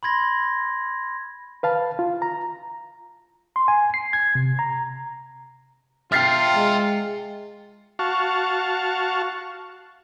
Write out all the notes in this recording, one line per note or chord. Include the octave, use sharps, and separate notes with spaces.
B5 C6 G#6 A#6
B4 F5 A5
F4
A#5
C6
G#5
C7
G#6
C3
A#5
F4 E5 G5 F6 A6 C7
G#3
F#4 F5 A5 C#6